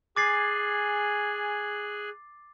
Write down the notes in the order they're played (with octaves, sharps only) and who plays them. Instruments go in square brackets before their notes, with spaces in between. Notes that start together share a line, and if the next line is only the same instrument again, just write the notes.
[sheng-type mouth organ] G#4 G#5 F#6 [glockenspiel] D6 A6 C7